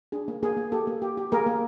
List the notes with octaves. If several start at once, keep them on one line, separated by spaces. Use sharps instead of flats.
D4 G#4
A#3
A#3 G#4
A#3
A#3 G4 A4
A#3
G4
G4
A#3 G#4 A#4
A#3